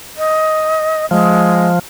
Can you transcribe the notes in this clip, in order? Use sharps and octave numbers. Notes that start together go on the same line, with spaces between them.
D#5
F3 G#3